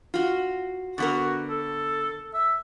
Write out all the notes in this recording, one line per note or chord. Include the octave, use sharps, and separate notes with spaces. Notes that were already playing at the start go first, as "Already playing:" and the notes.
F4 F#4
D3 B3 F#4 A#4
A4
E5